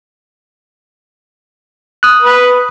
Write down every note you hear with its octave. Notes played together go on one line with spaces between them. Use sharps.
D#6 F#6
B4